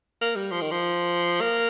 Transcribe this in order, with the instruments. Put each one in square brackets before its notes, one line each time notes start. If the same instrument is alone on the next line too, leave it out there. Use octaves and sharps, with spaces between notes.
[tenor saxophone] A#3
G3
F3
D#3
F3
A#3